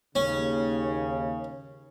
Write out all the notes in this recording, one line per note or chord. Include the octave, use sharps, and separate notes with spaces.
D#2 C#3 C#4